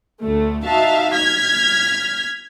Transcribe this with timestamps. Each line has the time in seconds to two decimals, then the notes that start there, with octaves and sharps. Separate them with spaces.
0.21 D2 A3
0.63 D#4 F#4 E5 F5 A5
1.15 F6 G#6 B6